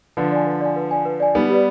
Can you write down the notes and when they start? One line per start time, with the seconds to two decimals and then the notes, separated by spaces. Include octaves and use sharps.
0.17 D3 F3 B4
0.32 D5 G#5
0.46 B4
0.61 D5 G#5
0.76 B4
0.91 D5 G#5
1.05 B4
1.20 D5 G#5
1.35 G3 B3 D#4
1.50 G4 B4 D5